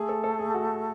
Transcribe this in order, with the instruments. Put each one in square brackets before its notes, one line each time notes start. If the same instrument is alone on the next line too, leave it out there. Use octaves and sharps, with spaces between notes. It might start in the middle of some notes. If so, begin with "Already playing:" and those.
Already playing: [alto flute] A3 [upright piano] G#4
[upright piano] A4
A4
G#4
F#4